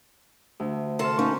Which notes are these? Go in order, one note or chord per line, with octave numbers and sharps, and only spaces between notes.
D2
C3 A4 A5 C6 F6
A#3 C#4 D#4